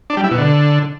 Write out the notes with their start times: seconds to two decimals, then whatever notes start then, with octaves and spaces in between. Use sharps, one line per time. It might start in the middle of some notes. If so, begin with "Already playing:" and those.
0.10 D4
0.17 G3
0.24 E4
0.31 B2
0.38 D3